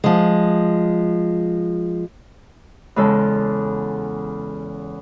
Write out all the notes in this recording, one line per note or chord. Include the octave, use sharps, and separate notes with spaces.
F3 G#3
E2 C#3 G#3 A4